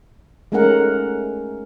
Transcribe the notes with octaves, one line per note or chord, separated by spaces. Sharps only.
G#3 A3 C#4 D#4 A#4 F#5